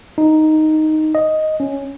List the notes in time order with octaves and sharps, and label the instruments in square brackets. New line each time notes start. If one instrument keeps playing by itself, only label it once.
[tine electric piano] D#4
D#5
C#4